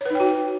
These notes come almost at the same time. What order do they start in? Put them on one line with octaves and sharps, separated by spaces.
C#5 B4 D#4 G5 F#4